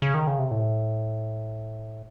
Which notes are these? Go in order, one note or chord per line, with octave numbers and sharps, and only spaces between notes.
C#3
D#3
C#3
C3
A2